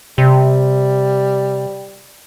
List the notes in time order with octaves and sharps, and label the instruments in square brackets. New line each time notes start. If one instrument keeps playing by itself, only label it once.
[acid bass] C3 [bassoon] G3